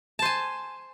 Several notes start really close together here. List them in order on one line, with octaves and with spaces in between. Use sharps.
A5 C5 G#5